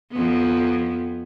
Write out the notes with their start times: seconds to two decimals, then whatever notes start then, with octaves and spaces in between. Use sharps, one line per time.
0.12 F2 B3